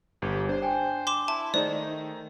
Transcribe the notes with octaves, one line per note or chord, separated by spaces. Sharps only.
G1 G4
D4 C5
C5 G5 G#5
C6 D6 E7
E4 A5
D#3 A3 D#4 G#4 C5 D5 D#5